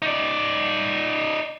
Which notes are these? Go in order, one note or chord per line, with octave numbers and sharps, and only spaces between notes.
D#4 D5